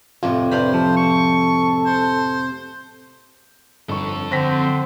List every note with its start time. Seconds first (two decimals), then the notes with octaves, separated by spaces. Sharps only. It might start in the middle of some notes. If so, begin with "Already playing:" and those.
0.23 F2 A2 C3 F4
0.51 G2 C3 C5 F5 B5
0.74 F3 A4
0.97 C#6
1.86 C5
3.89 G1 F2 A4 C#6
4.31 D3 C4 C5 C#6 A#6 B6